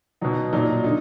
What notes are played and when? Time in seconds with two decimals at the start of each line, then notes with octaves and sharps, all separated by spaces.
0.21 B2 F#3 D#4
0.53 A#2 F#3 D#4
0.84 D3 D#4